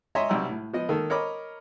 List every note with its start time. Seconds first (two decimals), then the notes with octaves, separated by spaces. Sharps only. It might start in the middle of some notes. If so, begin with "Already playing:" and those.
0.15 C#5 D#5 E5 G#5 A#5 C6
0.29 B1 C3 G3 G4 A#5 E6
0.49 A2
0.73 F3 B3 D#5
0.89 D#3 A#3 A4
1.10 A#4 C#5 D#5 B5 D6